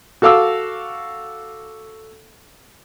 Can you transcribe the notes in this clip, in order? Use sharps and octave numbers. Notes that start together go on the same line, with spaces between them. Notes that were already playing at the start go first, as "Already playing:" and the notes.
F#4 A4 F5 D6 E6